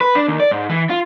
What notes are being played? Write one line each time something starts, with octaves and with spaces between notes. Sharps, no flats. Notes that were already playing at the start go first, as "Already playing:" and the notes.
B4
D4
D#2
D5
G#2
E3
F4